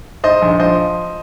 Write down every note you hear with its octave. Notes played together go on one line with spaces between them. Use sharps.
G#2 C5 D#5
A#1
F3 C5 D#5